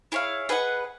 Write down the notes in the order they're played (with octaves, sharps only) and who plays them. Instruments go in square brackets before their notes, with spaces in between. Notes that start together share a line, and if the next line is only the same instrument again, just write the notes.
[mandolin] E4 G#4 C#5 F5
G#4 B4 D#5 F#5